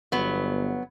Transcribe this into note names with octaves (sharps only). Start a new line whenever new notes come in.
G1 F#3 B3